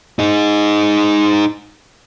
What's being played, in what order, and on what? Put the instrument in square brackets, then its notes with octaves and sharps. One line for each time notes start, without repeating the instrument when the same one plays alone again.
[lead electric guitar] D#4 G#4